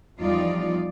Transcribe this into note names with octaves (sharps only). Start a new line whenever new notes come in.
E2 F3 G3 D#4 F4 D5